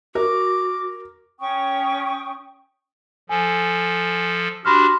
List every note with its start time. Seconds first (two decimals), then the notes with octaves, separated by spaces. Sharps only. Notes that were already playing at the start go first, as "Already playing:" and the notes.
0.15 F#4 A#4 D6
1.40 C#4 G5 C#6 D#6
3.29 F3 A4 G#5
4.65 D4 F#4 G4 B5 C6 F6